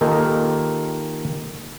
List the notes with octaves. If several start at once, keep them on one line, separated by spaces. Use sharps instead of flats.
D#3 A#3 D#4 F4 G4 A4